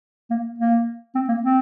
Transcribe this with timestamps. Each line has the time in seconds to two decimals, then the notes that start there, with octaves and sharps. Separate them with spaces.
0.31 A#3
0.59 A#3
1.15 C4
1.28 A#3
1.43 C4